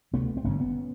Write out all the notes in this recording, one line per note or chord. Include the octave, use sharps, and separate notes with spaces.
D2 C3 A3 B3
C4
G1 F#2 D3 B3 C#4
B3 C#4